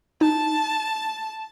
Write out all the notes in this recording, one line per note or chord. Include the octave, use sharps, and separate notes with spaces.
D#4 A5